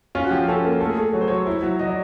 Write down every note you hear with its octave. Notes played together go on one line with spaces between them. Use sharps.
C#4 F4
F#4
F3 G4
C#4 A4
A#3
A3 A4
G#4
A3 A4
F#3 C#5
C5
F#3 C#5
E4
F#3
F#3 D#5
D5